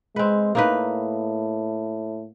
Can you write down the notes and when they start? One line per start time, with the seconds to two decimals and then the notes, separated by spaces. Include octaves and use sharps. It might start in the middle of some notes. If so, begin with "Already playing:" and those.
0.16 G#3 C4 B4
0.55 A2 A#3 D#4 B4